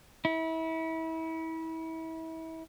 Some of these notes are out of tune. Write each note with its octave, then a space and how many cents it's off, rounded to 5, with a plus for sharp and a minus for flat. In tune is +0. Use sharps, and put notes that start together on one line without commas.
E4 -30